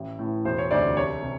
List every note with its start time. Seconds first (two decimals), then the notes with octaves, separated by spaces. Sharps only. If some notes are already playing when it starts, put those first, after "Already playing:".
Already playing: A1
0.19 A2 E3
0.45 E1 C5
0.58 C#5
0.71 D2 C3 C5 D5
0.96 C2 C#5
1.22 C3